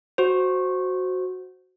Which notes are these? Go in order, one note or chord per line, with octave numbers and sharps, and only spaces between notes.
F#4 C5